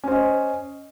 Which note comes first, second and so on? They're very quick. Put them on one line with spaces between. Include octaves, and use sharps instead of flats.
C#4 C5 D#5